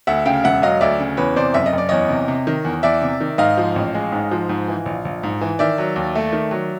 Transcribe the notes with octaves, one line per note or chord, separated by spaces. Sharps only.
D2 E5 F#5
C#3 F5 G5
E1 E5 F#5
F#3 D#5 F5
D2 D5 E5
C#3
E2 B4 C#5
C3 C5 D5
F#1 E5
D#5
F#1
D5
E2 C#5 D#5
C3
C3
D#3
E2
E2 D5 E5
C3
D#3
G#2 D#5 F5
F3
A1
G#3
G#2
F3
G#2
E3
A#1
A#1
G#2
E3
D#3 D5 E5
F#3
D#2
A3
D#3
F#3